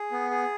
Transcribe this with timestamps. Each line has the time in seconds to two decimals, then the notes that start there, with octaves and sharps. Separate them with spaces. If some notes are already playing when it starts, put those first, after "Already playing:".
Already playing: G#4
0.11 B3
0.31 G#4